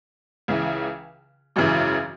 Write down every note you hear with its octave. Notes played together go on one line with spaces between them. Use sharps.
C#2 C#3 E3
G#1 F#2 C#3 E3